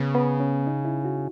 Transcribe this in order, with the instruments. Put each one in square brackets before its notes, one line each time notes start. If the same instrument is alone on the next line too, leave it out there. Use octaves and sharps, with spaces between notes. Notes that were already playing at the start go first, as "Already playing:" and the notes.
Already playing: [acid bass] C#3 [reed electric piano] B3
[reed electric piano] B3
C#4
D#4
E4
F#4